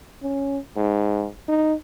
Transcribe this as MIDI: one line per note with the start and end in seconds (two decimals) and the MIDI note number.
0.23 0.58 61
0.76 1.27 44
1.48 1.74 63